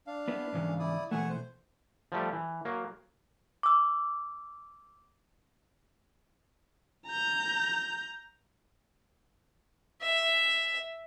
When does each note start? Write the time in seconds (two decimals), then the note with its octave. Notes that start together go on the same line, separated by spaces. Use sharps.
0.07 D4 F5
0.28 B3 E4 B4
0.53 G#2 C#3 E3
0.79 E4 D5 D#6
1.11 B2 E3 A3 F#5 G#5 C#6
1.29 C5
2.12 F3 G3 A3 G4
2.33 E3
2.65 F#3 A#3
3.63 D6 E6
7.07 A#5 G6
10.02 E5